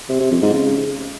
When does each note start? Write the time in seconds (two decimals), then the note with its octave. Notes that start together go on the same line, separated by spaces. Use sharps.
0.09 C3
0.20 C3
0.31 F2
0.42 G#2
0.53 C#3